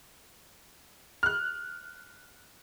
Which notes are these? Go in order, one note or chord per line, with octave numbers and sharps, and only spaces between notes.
F6 F#6